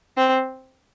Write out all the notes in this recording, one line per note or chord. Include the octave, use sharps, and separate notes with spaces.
C4